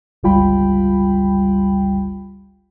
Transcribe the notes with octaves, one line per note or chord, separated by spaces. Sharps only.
G1 C#2 G3 F4 G5 B5